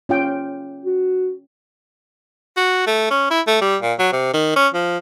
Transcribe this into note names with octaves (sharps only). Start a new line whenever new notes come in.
C#4 F4 G5
F#4
F#4
A3
C#4
E4
A3
G3
A#2
F#3
C3
D#3
C#4
F3